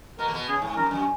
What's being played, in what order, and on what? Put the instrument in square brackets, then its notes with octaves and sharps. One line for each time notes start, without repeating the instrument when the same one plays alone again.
[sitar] B2 B3 [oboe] A#4
[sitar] A#3
B2 B3
[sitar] C#3 [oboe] G#4
[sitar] G#2
[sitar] F#2 [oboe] A#4
[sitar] F#2